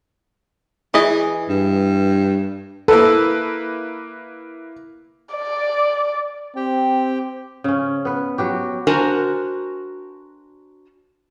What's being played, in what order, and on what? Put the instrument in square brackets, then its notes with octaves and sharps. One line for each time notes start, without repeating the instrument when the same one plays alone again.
[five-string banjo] E3 D#5 [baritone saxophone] G#4
[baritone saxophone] G2
[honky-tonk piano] A#3 E4 B4 [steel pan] A4
[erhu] D5
[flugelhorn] C4 [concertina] G4 G5
[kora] C#3 C#4
B3 B4
F#3 F#4 G4
[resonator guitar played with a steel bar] D4 F#4 A#4 C5 G#5 A#5